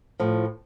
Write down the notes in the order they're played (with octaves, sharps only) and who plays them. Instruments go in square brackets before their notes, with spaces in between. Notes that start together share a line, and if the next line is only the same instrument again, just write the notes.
[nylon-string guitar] A2 F3